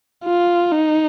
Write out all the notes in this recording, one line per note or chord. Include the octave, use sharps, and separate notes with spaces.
F4
D#4